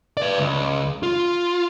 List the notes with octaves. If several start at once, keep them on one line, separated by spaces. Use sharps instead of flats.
B4 D5
C#2
F4